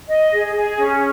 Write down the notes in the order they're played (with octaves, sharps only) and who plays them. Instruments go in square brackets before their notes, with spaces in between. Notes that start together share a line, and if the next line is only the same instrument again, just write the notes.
[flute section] D#5
G#4
G#4
C#4